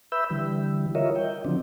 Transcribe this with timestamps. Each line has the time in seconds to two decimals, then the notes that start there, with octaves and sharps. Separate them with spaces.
0.12 B4 E5 B5 E6 G6
0.30 D3 E3 G3
0.95 F4 A#4 C#5 D#5 E5
1.16 G5
1.45 D3 F3 F#3 C4 D4